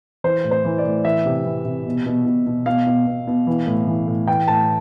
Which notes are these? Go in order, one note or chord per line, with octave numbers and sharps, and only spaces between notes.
E3 C5
A2
C5
E3
D5
A2
E3 E5
C3
E3
C3
B2
B2
B2
B2
B2 F5
B2
B2
B2
E3
A2
E3
A2
E3 G5
A2 A5